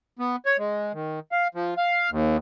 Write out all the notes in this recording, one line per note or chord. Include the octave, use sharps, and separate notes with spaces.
B3
C#5
G#3
D#3
F5
F3
F5
D#2